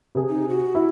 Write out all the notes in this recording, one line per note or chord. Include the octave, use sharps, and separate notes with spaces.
C3 G#4
D#4
F#4
E4